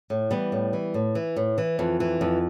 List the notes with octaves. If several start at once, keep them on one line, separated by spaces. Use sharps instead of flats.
A2
E3 G3 B3
A2
E3
A2
E3
A2
E3
F2
E3
F2